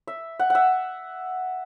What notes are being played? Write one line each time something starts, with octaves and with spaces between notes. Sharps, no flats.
E5
F#5
E5 F#5